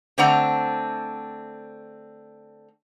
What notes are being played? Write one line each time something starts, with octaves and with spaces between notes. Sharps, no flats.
D3 A3 C4 D4 F#5 A#5